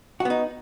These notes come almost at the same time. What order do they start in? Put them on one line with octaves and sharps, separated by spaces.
F#4 B3 D#4